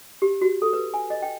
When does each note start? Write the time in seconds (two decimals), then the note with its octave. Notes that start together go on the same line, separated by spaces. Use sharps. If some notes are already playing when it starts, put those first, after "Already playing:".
0.22 G4
0.41 F#4
0.62 A4
0.73 B4
0.94 G#5
1.10 D#5
1.22 G5